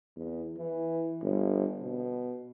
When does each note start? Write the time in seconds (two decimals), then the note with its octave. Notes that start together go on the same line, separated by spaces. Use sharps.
0.16 E2
0.58 E3
1.22 G1
1.82 B2